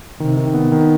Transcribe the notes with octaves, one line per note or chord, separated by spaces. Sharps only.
C3 D#3
D#3
B3
D#3